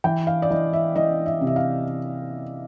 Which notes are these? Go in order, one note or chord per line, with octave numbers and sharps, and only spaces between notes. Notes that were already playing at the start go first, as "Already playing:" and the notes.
E3 G5
F5
D5
E3 D#5
E5
E3 D#5
E5
C3
E5
F5